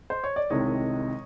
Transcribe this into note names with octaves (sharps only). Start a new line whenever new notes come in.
C5
C#5
D5
C2 C3 D#3 G#3 C#5 D#5